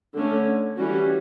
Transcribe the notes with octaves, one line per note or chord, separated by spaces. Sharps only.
D3 A3 C#4
E3 G3 C#4 F#4